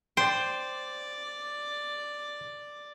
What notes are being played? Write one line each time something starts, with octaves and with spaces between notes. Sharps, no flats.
C5 D5 G5